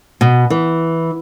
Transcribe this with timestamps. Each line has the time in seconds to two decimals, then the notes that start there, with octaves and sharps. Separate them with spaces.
0.21 B2
0.50 E3